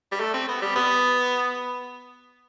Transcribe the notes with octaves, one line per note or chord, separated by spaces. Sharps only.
G3
A3
C4
B3
G3
B3